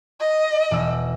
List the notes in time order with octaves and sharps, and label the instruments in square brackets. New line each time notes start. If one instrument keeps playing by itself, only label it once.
[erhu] D#5
[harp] E1 E6